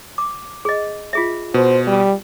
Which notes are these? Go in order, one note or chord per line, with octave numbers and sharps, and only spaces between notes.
D6
G#4 D#5
F4 G#4 E5
B2 C5
G3